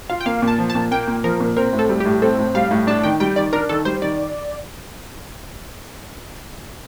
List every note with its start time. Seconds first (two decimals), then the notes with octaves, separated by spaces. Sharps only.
0.10 F4 F5
0.21 G5
0.26 A#3 F5
0.42 A#2
0.48 A5
0.59 F3
0.70 A5
0.75 A#2
0.91 A#3 G5
1.07 A#2
1.24 F3 A#4
1.40 A#2
1.56 C4 A#4
1.73 A2
1.79 A4
1.89 G3
2.00 G4
2.05 A2
2.22 C4 A4
2.38 A2
2.55 G3 F5
2.71 A2
2.87 D4 A5
3.03 D#3 G5
3.20 G3 G5
3.36 D#3 D5
3.53 D4 A#4
3.69 D#3 A4
3.85 G3 C5
4.02 D#3 D5